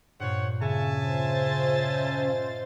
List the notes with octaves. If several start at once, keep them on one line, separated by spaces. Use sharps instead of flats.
G2 A#2 C5 C#5 F#5
C#3 C#5 E5 G#5 A5
F4 C5 A6
D#5